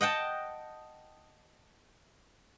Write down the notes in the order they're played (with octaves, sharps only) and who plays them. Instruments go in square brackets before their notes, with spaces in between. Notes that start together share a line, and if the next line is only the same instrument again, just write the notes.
[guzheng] D#5 F#5 G5 A5